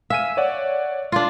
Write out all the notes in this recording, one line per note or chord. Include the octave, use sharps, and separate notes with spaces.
E5 F5 G#5 D#7
C#5 D5 F#5
D4 F4